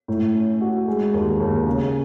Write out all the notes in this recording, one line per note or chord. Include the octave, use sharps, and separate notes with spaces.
A2
C#4
F#4
G#3
D#2
D#2
C#3